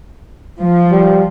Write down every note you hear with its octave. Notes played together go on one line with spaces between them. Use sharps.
F3
G3